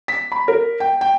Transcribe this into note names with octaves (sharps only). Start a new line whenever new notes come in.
B6
B5
A#4
G5
G5